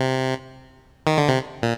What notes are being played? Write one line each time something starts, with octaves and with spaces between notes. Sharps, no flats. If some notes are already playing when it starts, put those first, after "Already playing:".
Already playing: C3
D#3
D3
C3
A#2